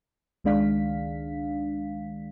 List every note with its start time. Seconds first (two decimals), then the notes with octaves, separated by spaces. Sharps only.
0.44 C#2 D#3 G#3 D4 F5 B6